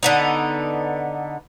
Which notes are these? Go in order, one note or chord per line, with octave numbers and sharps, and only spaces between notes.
D3 B3 D#4